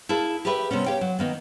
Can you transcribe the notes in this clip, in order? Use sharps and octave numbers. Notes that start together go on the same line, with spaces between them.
E4 G#4 A#4 F5 A5
G4 G#4 A#4 B4 E5 G5
C3 G3 B3 C#4
G4 C#5 F5 G5
F#3
D#3 A#3 B3